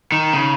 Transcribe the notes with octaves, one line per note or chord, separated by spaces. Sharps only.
D#3
C#3